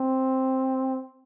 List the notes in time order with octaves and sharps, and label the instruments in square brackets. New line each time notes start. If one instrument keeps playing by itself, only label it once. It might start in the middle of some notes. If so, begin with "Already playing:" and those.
Already playing: [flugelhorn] C4